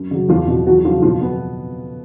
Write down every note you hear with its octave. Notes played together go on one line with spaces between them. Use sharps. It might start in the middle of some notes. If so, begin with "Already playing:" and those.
Already playing: F#2
C#3 F#3
E2 F3 F4
B2 F#3
E2 F#3 F#4
C#3 F3 F#3 F4
B2 F3 F4
F#3 B3 B4